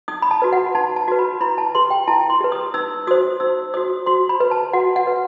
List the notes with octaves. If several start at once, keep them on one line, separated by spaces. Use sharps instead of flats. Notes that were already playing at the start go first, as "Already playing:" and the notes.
D#4 D#6
B5
A5
F#4 B4
F#5
D#4 A5
A5
F#4 B4
B5
E4 B5
A5
G4 B4 C6
G5
E4 A5
C6
G4 B4
D#6
D#4 E6
F#4 C5 D#6
D#4 E6
F#4 C5 D#6
F#4 C6
B5
B4
A5
F#4 F#5
F#5
B4